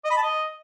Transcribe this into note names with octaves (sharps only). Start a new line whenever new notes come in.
D#5
B5
A5
D#5